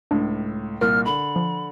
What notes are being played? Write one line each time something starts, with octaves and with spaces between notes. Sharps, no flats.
C#2 A2 D4
C2 A#2 A#4 F6
D3 B5
F3